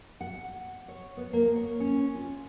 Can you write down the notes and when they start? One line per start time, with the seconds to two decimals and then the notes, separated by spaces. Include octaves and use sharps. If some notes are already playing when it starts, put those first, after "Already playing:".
0.21 F#5
0.88 C#5
1.17 B3
1.33 A#3
1.55 C#5
1.80 C#4
2.15 F4